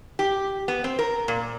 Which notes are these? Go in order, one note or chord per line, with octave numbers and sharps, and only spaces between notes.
G4
B3
C4
A#4
A#2